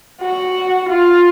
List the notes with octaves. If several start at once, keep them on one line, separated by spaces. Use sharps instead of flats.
F#4
F4